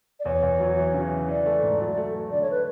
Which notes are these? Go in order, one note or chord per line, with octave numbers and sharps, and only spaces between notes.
D5
E2 C#5
E2
F#3
E3
C#3
E3
E3 D5
A3
G#2
F#3
A3
A3
D3 D5
C#5
B4